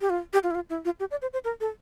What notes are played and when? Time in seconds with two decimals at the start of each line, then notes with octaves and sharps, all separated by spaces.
0.01 G4
0.10 F4
0.33 G4
0.43 F4
0.51 E4
0.55 F4
0.70 E4
0.85 F4
1.00 G4
1.11 D5
1.22 C5
1.33 C5
1.44 A#4
1.61 A4